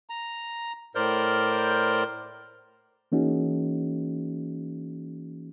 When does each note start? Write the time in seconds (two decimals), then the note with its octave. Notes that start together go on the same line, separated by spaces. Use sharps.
0.10 A#5
0.95 A2 A#4 C5 D5 F6 G6
3.12 E3 A#3 C#4 D#4 F#4 G#4